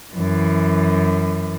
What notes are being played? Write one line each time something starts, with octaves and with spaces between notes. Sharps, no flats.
F#2 E3